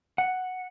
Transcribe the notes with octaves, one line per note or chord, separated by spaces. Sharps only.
F#5